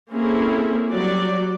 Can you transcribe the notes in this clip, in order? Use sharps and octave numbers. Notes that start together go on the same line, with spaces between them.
A#3 C4 C#4 E4 G#4 A4
F#3 G3 D5